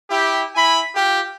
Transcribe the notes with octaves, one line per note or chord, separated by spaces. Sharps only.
E4 G4
E4 G#5 B5
F4 G4